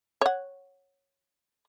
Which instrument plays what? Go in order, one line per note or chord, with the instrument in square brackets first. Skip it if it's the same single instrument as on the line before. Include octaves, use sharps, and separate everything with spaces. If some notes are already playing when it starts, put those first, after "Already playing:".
[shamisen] C#5 F#5